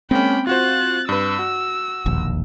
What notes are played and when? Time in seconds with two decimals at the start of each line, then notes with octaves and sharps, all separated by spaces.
0.11 G#3 A#3 C4 C#4 G5 B5
0.47 F4 F#4 C5 F#6 A6
1.09 G2 B4 E6
1.39 F#4
2.06 E1 A#1 D#2